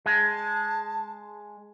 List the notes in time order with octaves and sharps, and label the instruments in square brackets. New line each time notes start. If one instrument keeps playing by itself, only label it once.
[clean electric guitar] G#3 [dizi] A5